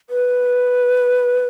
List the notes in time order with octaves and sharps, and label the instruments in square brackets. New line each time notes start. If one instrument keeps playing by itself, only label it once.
[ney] B4